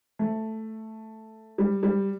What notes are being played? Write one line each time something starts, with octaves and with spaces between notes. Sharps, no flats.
A3
G3
G3